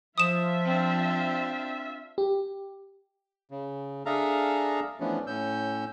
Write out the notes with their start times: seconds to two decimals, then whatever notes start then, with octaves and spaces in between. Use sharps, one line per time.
0.18 F3 F4 E5 D#6 E7
0.64 C4 D4
2.18 G4
3.51 C#3
4.06 D4 G#4 A4 E5 F5 A#5
5.00 E3 F3 A3 B3 C#4 D4
5.27 A2 C#4 E6 G6